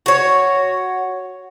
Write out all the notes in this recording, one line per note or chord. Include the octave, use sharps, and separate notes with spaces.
F#4 C#5